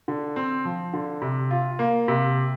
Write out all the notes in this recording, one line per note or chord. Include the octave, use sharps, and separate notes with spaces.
D3
C4
F3
D3
C3
F4
A#3
C3